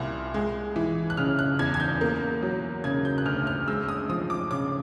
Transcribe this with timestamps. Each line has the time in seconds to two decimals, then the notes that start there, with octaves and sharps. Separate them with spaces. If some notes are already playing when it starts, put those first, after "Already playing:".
Already playing: C2 A#2 F6
0.34 G#3
0.76 E3
1.10 F#6
1.17 C#3 F6
1.39 F#6
1.59 E2 G#6
1.74 G#6
1.80 G6
2.01 A#3
2.43 F#3
2.84 C#3 G#6
3.05 G6
3.18 F#6
3.26 D2 F6
3.47 F6
3.68 G#3 E6
3.89 D#6
4.09 F3 D#6
4.30 D6
4.51 C#3 D6